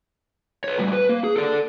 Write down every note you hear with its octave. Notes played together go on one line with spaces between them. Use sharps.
B4 C#5
A2 G3
B4
A#3
G#4
A4 D5